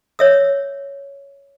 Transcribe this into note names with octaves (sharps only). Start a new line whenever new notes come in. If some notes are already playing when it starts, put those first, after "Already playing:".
C#5 E5 E6